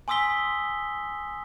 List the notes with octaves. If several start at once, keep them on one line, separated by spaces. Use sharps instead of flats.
G#5 C6 D#6 E6 B6 G7